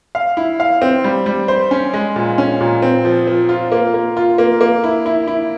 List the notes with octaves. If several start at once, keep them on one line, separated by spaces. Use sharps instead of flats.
F5
E4
F5
C4
G3
G3
C5
C#4
G#3
A#2
C#4
A#2
C4
F3
F3
F4
A#3
A#3
F4
A#3
A#3
E4
E4
E4